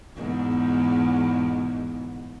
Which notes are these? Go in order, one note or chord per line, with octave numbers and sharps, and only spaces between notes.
E2 G#2 B2